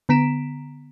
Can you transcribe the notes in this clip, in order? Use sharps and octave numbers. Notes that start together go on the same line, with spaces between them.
D3 B3 A#5 B6 D7 E7